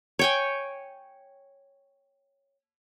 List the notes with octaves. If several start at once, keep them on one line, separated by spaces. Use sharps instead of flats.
C#5 G5 G#5